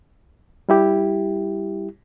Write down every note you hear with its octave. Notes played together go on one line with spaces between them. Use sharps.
G3 E4 G4